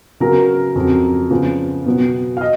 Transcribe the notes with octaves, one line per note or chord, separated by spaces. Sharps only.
C#3 F#3 B3 A#4
F2 C#3 F#3
C#3 F3 B3
B2 F#3 B3
F5
D#5